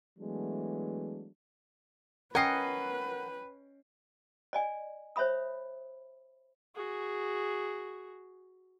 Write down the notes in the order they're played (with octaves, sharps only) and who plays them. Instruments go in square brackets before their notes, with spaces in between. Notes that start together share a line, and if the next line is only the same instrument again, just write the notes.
[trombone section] E3 F#3 G#3 A3 B3 D4
[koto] C#4 D#5 [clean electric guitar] A#4 F#5 [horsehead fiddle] B4 [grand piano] G5 C7
[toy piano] D5 D#5 G#5
C5 C#5 E5 B5 D#6
[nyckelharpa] F#4 G#4